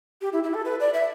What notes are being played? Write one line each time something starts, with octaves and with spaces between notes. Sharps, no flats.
G4
E4
E4
A4
B4
D5
E5